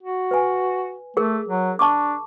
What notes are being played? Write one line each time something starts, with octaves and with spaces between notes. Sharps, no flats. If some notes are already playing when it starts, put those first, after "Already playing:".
F#4
B4 G#5
A3 G#4 A#4
F#3
D4 A5 C#6 D6